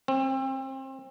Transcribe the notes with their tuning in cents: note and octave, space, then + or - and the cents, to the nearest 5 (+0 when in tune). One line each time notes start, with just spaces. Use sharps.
C4 +30